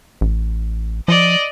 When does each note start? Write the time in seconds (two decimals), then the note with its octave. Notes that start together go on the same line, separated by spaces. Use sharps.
0.21 A1
1.08 F3 D5 D#5